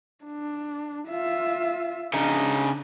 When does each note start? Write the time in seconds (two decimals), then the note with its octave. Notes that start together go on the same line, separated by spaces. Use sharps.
0.25 D4
1.09 F4 E5
2.14 C#3 D4 D#4